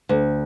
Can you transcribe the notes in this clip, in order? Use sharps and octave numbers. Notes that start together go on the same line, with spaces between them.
D2